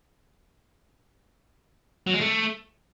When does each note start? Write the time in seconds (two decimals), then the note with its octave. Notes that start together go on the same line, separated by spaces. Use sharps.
2.07 F#3
2.14 G#3
2.20 A3